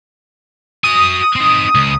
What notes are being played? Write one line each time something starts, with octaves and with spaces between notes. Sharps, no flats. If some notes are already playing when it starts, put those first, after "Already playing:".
F#4 G#5 D#6
C4 D#4
C#2